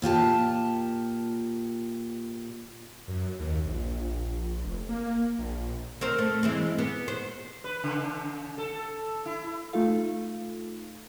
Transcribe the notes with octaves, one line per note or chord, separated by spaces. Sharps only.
A#2 F4 G4 A5
F#2
D#2
A#1
F1
A#3
A#1
C4 A#4 C5
A3
E3 G#3 C4
B3
C5
B4
C#3
A4
E4
A3 D#4 F4 A4 F5